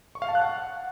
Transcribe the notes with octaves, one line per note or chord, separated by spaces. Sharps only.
C#6
F5
A5
F#6
F#5